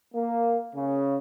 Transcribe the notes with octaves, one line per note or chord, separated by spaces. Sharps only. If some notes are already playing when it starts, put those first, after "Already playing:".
A#3
C#3